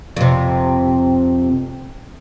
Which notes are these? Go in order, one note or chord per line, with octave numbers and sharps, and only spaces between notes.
F2 C3